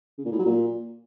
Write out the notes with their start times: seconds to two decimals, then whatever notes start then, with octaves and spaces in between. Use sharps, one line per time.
0.18 C#3
0.25 A#2
0.32 A2
0.39 F#3
0.46 A#2